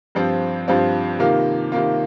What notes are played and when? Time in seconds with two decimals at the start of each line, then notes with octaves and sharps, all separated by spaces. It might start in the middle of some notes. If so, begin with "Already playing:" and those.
0.15 G2 F3 C4 F4
0.68 G2 F3 C4 F4
1.19 C3 D#3 A#3 F4
1.72 C3 D#3 A#3 F4